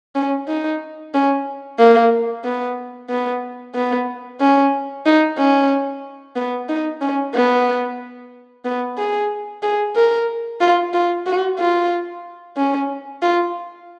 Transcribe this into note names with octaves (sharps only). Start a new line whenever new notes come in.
C#4
D#4
C#4
A#3
B3
B3
B3
C#4
D#4
C#4
B3
D#4
C#4
B3
B3
G#4
G#4
A#4
F4
F4
F#4
F4
C#4
F4